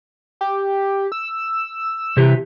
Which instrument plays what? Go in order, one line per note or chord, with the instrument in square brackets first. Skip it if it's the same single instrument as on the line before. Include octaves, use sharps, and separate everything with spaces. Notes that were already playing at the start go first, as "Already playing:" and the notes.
[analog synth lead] G4
E6
[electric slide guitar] C3 E3 G4